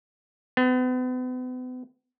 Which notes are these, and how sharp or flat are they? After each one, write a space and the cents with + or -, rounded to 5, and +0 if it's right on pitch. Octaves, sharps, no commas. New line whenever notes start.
B3 +40